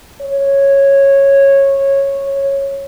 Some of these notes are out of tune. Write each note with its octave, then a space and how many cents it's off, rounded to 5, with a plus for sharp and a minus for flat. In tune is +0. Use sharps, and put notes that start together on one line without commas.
C#5 -10